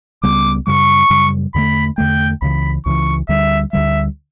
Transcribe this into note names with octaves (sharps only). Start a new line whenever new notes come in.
C#2 C#3 G3 B3 D6
F#2 C#3 G3 C#6
F#2 C#3 G3
E2 D3 A3 B5
E2 D3 A3 G5
C#2 C#3 E3 B5
C#2 C#3 E3 C#6
D2 D3 G3 E5
D2 D3 G3 E5